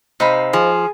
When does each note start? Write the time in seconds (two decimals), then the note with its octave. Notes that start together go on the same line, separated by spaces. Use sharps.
0.20 C3 D#4 C5 F5 B5
0.53 F3 G#4